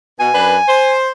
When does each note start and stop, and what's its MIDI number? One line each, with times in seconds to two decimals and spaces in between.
0.20 0.29 47
0.20 0.94 80
0.34 0.57 42
0.34 0.57 62
0.34 0.57 71
0.68 1.10 72